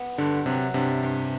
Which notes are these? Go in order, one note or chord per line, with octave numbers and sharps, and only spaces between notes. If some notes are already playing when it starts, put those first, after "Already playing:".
Already playing: B3
G2 D3
C3 F#3
G2 C3
G2